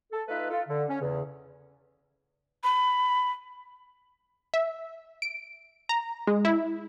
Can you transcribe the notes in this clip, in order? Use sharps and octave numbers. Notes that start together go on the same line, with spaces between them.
A4
A3 D#4 F4 A4 B4
F4 A4
D3
C#4
E2 C#3
B5
E5
D7
A#5
G#3
E4